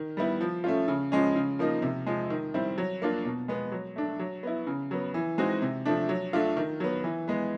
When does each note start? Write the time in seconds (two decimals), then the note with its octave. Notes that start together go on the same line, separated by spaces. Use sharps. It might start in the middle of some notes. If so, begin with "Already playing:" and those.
Already playing: D#3
0.17 G3 B3 E4
0.41 F3
0.64 A3 C#4 F4
0.88 C#3
1.12 F3 G#3 C#4
1.36 C#3
1.59 F3 A#3 D#4
1.82 C3
2.06 F3 G#3
2.30 D#3
2.54 G3 C4 E4
2.78 F#3
3.02 A#3 D4 F4
3.25 B2
3.48 G#3 B3
3.72 F#3
3.96 A3 D4
4.19 F#3
4.43 B3 E4
4.67 C#3
4.91 F#3 B3
5.14 E3
5.38 G#3 C4 D#4 F#4
5.62 C3
5.85 F3 A3 D4
6.09 F#3
6.33 A3 D4 F4
6.57 D#3
6.80 F#3 B3
7.04 E3
7.28 G#3 B3